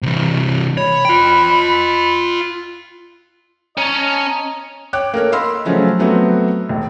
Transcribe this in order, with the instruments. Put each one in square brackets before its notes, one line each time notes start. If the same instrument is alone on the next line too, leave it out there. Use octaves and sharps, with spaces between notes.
[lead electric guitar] C3 E3
[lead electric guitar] C#5 [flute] B5
[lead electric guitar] F4 G5
[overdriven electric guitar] C#4 C#5 [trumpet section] D#5 A5 A#5
[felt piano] C#5 G5 D6 F#6
A#3 A4 A#4 C#5
D#5 F5 B5 C6 E6 F6
C#3 F3 F#3 A3 C#4
F#3 A3 B3 C4 F#4
E1